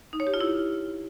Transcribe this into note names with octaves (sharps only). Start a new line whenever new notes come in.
D#4
C#5
G4
F4
E4